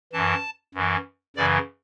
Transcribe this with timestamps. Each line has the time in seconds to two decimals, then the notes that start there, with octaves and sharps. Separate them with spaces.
0.13 F#2 E3 A5
0.75 F#2 E3
1.36 F#2 C#3 E3 D5